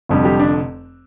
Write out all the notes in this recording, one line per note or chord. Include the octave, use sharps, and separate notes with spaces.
F1 F2 D3 G3
G3 G4
D4